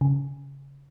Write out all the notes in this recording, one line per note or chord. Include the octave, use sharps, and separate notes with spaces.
C#3